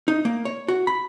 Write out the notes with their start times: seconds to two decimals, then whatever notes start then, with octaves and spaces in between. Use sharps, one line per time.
0.08 D#4
0.25 A#3
0.45 C#5
0.68 F#4
0.87 B5